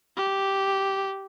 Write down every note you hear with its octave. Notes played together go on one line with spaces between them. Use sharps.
G4